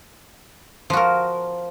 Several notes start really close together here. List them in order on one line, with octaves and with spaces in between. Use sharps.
F3 F#4 A#4